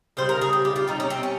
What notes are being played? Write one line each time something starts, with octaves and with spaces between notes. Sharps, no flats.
C#3 G3 C5
A#4
G#4
G4
G4
F4
C3 G3 D#4
C#4
C4
C#4